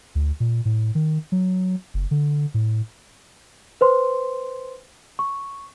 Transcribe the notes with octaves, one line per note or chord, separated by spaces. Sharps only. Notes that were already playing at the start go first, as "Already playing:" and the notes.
D2
A#2
A2
D#3
F#3
F#1
D3
A2
B4 C5 C6
C#6